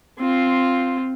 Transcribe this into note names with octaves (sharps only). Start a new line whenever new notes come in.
C4 F4